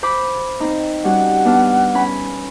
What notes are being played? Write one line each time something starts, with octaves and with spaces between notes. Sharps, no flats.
C5 B5 D6
C4 D#4
G3 C#4 F#4 F#5
B3 D4 F6
C#4 B5